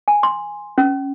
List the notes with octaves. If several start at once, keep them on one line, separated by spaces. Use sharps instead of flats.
G#5
C6
C#4